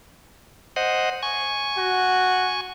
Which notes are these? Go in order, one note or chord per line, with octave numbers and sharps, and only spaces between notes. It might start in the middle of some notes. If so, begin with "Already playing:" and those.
C5 D#5 F#5
G#5 C#6
F#4